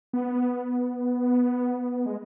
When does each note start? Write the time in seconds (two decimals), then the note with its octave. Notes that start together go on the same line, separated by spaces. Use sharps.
0.13 B3
2.06 G#3